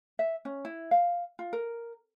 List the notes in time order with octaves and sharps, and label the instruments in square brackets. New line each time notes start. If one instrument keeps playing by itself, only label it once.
[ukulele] E5
C#4
E4
F5
F4
A#4